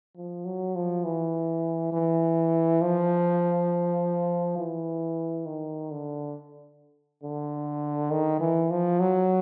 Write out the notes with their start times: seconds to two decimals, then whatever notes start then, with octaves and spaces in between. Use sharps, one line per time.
0.17 F3
0.45 F#3
0.76 F3
1.04 E3
1.92 E3
2.81 F3
4.58 E3
5.46 D#3
5.91 D3
7.23 D3
8.11 D#3
8.40 E3
8.71 F3
9.00 F#3